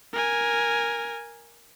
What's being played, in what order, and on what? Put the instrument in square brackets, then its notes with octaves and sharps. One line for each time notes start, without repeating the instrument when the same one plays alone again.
[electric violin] A#4 G#5